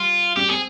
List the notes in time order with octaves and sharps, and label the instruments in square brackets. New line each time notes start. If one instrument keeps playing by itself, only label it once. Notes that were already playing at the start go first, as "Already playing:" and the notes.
Already playing: [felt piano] G3 [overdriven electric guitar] F4
[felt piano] G3 [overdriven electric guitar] G4
[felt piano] C4 [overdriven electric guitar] G#4